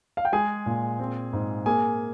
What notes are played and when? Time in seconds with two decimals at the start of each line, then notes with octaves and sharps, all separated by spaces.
0.17 F5
0.25 G5
0.32 G#3 G#4 G#5
0.66 A#2
0.99 C4
1.33 G#2
1.66 A#3 G#4 G#5